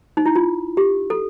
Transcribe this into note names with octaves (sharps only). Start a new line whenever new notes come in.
D#4
E4
F4
G4
A4